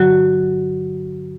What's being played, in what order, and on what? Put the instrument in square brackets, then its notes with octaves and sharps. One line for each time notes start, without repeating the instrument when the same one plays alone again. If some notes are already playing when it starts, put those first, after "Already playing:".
Already playing: [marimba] G2 D3 F#3 F#4